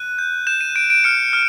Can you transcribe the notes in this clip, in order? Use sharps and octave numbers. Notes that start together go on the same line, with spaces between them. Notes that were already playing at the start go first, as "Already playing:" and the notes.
Already playing: F#6 D#7
G6
G6 E7
D#7
G6 D7
D7
F6 C#7
F6